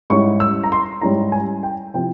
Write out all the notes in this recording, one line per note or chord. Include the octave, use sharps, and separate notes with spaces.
G#2 G3 C#4 E4 C#6
E6
A#5
C6
G#2 G3 C#4 E4 A#5
G#5
G5
C3 F3 C4 E4 G5